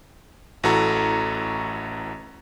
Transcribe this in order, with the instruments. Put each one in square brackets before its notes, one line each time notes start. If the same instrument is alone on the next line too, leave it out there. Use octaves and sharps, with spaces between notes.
[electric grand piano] A1 E3 F#4 A4 A#5 C#6